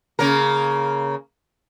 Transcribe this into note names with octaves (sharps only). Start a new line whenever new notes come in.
C#3 A#3 A#4